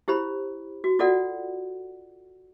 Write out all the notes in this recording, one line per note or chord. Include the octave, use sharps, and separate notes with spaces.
E4 G4 C5 B5
F#4
F4 F#4 A4 D5 F#5